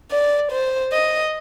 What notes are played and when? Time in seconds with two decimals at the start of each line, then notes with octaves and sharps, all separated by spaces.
0.11 D5
0.52 C5
0.93 D#5